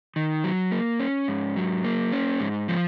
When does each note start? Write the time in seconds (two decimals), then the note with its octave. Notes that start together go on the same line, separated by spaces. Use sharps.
0.16 D#3
0.44 F#3
0.72 A#3
1.00 C#4
1.28 G#2
1.56 F#3
1.84 A#3
2.12 C#4
2.40 G#2
2.68 F3